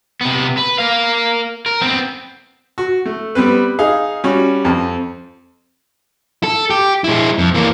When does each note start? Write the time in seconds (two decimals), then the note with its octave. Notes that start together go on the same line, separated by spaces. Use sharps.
0.21 C3 B3
0.57 B4
0.79 A#4 F5
1.66 A#4
1.81 B3 C4
2.78 F#4
3.06 A3
3.35 G3 B3 C4 B4
3.79 D#4 G#4 F5
4.24 G3 C#4 F#4
4.65 F2 C4
6.43 A4
6.70 G4
7.04 G#3 E4
7.38 F2
7.54 E3 A#3